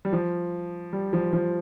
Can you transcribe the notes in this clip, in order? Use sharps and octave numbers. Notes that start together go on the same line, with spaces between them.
G3
F3
G3
F3
F3